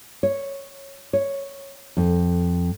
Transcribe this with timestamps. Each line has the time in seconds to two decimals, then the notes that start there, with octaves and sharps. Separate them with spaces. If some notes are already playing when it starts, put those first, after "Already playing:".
0.23 C#5
1.13 C#5
1.97 F2